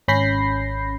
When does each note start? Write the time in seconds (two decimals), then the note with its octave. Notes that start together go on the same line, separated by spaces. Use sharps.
0.08 G#1 C#4 B5 G6 A#6 C7